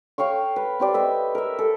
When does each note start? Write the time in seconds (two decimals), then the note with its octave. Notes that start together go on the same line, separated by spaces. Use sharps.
0.18 C#5 F5 G5 C#6
0.56 B4
0.80 C4 G4 D5
0.94 B4 D#5 E5
1.35 A#4 E5
1.59 A4